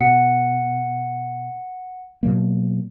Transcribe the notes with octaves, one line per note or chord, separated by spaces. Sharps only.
B2 F#5 C#7
B2 F#3 A#3